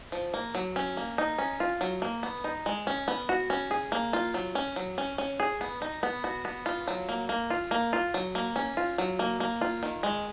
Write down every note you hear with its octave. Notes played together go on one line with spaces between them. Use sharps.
F3
A#3
F#3
C#4
A#3
D#4
C#4
F4
F#3
A#3
B3
D#4
G#3
C#4
B3
F#4
C#4
G#4
A#3
F4
F#3
C#4
F#3
C#4
C#4
G#4
B3
D#4
B3
F#4
B3
F4
F#3
A#3
A#3
F4
A#3
F4
F#3
A#3
C#4
F4
F#3
A#3
A#3
F4
D#3
G#3